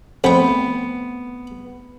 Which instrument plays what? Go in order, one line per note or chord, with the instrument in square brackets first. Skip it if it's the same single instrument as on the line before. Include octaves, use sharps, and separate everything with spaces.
[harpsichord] F2 G5 [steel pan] A3 C4 [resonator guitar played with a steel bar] B3